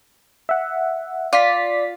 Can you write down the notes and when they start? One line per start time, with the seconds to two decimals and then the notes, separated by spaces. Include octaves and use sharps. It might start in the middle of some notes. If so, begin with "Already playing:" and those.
0.49 E5 F#5
1.33 F4 D5 B6